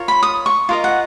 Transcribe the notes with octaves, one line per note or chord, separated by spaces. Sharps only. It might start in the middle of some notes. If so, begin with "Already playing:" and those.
Already playing: F4 A#4 C#5
B5
D#6
C#6
F4 A#4 D#5
F#5